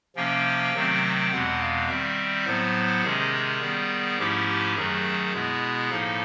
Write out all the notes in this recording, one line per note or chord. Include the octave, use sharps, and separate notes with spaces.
C3 F3 A#3 C#4 G5
C3 D#3 F#3 A3 C4
E2 B2 G#3 C4 F#5
F5
D#3 G3 C4 E5
A2 F#3 B3 C5
C3 D#3 G#3 C#4 G#4
D#3 G3 B3
G#2 F3 A3 C#4 E4 G4
G4
F#2 D#3 F#3 A3 G#4
B2 G#3 B3 E4
A2 F3 A#3 D#4 A4